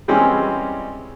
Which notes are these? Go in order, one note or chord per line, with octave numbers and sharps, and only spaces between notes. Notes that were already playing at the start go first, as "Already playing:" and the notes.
E3 G3 G#3 C4 C#4